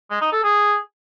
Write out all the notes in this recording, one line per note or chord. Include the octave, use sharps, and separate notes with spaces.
G#3
D#4
A4
G#4